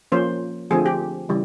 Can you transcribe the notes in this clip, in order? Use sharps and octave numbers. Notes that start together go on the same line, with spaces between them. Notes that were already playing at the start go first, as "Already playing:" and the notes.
F3 A#3 C#4 C5
D3 F3 A3 C4 G#4
G4
C#3 E3 G3